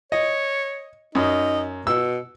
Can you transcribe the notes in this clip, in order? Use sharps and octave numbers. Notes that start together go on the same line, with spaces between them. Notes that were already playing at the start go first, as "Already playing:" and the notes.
C#5 D#5
F#2 D#4 D#6
B2 E6